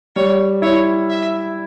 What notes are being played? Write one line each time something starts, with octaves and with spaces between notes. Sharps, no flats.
G3 C#5
E4 C#5
E5